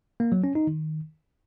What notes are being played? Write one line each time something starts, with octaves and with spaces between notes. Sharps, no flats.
A#3
F#3
C#4
D#4
D#3